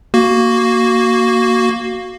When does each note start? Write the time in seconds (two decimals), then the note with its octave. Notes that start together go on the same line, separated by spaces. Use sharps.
0.14 A#3 F#4